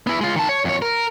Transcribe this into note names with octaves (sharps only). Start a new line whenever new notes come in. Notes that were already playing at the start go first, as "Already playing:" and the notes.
B3 E4
G#3 F4
D#3 A5
C#5
F2 C#5
A#4